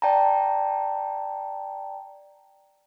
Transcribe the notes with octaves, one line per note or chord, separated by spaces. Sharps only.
D5 G5 A5 A#5